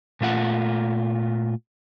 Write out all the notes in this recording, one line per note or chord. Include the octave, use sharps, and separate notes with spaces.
A#2 A3 F4 F#5